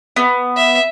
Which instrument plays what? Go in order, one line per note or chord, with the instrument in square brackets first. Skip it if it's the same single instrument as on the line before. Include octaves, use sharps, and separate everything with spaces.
[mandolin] B3
[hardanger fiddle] E5